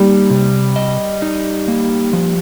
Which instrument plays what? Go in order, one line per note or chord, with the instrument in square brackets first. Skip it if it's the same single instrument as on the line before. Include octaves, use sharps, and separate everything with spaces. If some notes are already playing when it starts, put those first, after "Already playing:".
Already playing: [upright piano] G3 [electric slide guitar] A#3 D#4
[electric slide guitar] C3
D#5
D#4
A#3
F3